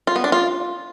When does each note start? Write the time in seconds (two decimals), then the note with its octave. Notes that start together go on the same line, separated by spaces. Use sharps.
0.07 F4
0.16 B3
0.24 D4
0.32 F4